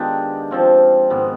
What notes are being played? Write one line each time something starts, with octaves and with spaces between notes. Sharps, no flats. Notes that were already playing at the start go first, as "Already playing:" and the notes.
Already playing: D#3 G#3 B3 D4 F4 G4
F3 C4 F4
G#2 D#3 G#3 B3